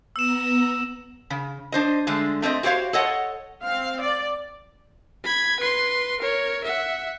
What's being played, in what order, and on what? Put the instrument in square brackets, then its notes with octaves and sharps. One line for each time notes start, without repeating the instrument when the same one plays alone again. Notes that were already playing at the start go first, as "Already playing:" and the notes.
[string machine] B3 A#5 [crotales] E6 E7
[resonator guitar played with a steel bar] C#3
D4 C5 D#5
D3 G#3 A3
A3 C4 C#5 D#5
F#4 G4 C5 C#5 F5
A4 C#5 D#5 F#5
[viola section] C4 F5
D5
[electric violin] B5 G#6
B4 C6
A#4 C#5
E5 F#5